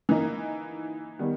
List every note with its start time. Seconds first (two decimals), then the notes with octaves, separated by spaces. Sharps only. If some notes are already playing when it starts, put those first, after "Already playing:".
0.09 E3 A#3 D#4
1.19 D#3 G3 B3